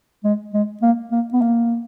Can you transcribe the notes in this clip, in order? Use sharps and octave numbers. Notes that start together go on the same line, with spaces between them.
G#3
G#3
A#3
A#3
B3
A#3